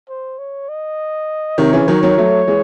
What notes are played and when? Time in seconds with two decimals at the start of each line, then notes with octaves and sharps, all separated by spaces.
0.09 C5
0.38 C#5
0.69 D#5
1.58 C3 D#3 C#5
1.73 C#3 E3
1.88 D#3 F#3
2.03 D#3 F#3
2.18 F#3 A3
2.47 E3 G#3